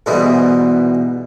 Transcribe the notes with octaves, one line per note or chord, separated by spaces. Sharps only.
G#2 B2 E3 G3 G#3